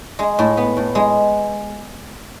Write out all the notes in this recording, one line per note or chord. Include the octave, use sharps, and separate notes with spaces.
G#3
A2
B3
A2
G#3